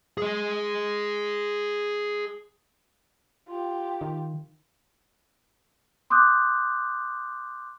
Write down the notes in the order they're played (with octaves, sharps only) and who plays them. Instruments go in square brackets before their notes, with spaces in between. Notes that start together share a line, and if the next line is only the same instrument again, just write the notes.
[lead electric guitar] G#4 D#5
[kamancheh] F4 G4
[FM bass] D#3
[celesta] C6 D6 D#6 F#6 G6